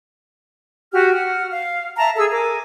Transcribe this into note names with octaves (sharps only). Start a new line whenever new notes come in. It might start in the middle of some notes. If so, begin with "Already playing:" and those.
F#4 G4 F#5 F6
F#5 F6
F5
E5 A5 A#5
G#4 A4 E6
A#4 G#5 D6